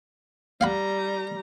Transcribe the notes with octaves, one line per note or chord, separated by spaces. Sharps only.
G3 F5 F#5 A#5 B5